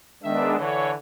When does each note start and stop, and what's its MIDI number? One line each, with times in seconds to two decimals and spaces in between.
0.23 0.53 51
0.23 0.57 56
0.23 0.57 59
0.23 0.57 62
0.23 0.53 76
0.57 0.93 50
0.57 0.93 52
0.57 0.91 73